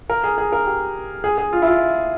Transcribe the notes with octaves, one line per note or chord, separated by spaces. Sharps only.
A#4
G#4
G#4
A#4
G4
G#4
G#4
F4
E4
F4